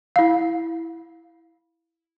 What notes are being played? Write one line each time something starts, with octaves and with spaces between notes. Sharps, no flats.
E4 F5